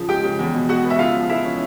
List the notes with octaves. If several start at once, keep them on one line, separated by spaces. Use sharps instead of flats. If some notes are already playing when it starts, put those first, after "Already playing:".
Already playing: C#3 F3
G#3 G4 G5
C#3
E2
B2
G#3 F#4 F#5
B3
E5
C#3 F4 F5
F3
G#3 E4 E5
C#4